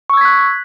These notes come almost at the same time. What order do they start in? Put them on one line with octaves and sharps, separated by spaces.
C#6 E6 G#6 B6 F#6